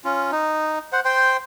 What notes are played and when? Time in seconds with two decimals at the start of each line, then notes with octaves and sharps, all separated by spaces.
0.05 C#4 F4
0.32 D#4
0.93 C5 F#5
1.05 C5 G5 C6